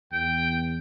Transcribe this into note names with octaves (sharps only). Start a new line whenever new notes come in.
E2 G5